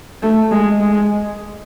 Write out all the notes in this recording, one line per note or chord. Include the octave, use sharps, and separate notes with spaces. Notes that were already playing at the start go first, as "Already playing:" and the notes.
A3
G#3
G#3